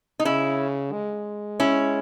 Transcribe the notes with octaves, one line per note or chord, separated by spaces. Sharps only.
D#4
C#3 C#4 E4
G#3
C#4 E4